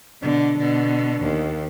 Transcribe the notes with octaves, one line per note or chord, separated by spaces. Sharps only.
B2 D3
B2 D3
D#2